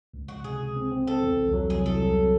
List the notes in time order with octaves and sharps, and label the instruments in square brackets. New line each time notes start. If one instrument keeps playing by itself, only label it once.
[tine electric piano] C#2
[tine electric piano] C#2 [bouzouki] F#4
[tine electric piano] C3 [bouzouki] G#4
[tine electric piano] C#2
C4
C4
[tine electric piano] C4 [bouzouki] A4
[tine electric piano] E2
C2
F#3
[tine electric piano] C2 [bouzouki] G#4
[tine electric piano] C2 [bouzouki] A4
[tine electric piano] F#3
C4